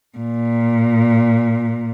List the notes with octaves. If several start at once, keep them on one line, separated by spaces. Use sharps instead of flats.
A#2